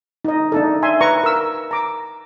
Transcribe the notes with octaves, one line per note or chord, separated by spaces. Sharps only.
D#4 D#5
D4 D#4 A4
E5 G#5 C6
B4 A#5 C#6
A#4 E6
A#5 D6